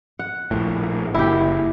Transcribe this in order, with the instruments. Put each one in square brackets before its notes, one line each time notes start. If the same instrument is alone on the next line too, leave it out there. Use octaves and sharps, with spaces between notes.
[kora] F#5
[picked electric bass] A#1 A2
[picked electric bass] F#1 [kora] E4 G4